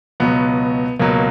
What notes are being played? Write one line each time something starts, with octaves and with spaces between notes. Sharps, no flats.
C#2 B2 F#3 B3
C#2 B2 F#3 A#3